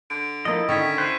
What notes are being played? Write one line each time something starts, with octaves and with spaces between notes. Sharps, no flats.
D3 D7
F3 A#3 E4 A4 D#5
D3 D#3 C#4 G5 C#6 A6 B6
E4 C5 F#6 B6 D#7